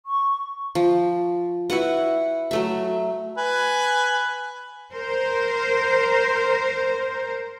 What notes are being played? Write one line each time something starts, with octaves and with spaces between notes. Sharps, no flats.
C#6
F3
E4 F#4 B4 F#5
F#3 A3 E5
B4 G#5
A#4 C5